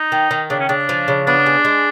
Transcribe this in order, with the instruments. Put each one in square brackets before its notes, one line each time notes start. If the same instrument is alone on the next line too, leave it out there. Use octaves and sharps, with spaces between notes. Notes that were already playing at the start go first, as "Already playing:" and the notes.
Already playing: [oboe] D#4
[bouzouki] D#3
D#3
[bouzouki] C#3 [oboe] D4
[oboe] C#4
[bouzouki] C#3 [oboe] D4
[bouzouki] F3
C#3
[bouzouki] B3 [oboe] D4
[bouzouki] G#3
G#3